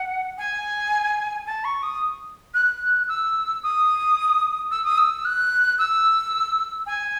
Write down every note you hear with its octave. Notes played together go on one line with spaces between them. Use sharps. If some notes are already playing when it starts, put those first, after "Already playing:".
Already playing: F#5
G#5
A5
C#6
D#6
F#6
E6
D#6
E6
D#6
E6
F#6
E6
G#5